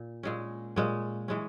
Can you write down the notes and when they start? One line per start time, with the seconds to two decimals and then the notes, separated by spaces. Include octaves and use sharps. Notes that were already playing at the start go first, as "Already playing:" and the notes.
Already playing: A#2
0.23 A#2 G#3 C#4
0.76 A#2 G#3 C#4
1.28 E3 G#3 C#4